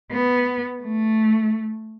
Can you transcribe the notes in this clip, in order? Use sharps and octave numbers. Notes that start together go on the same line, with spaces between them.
B3
A3